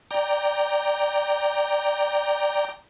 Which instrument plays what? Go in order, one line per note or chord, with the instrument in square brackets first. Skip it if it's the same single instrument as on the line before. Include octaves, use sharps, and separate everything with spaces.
[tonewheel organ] D5 G5 A#5